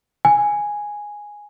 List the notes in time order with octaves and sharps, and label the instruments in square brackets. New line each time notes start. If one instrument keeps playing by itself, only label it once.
[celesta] G#5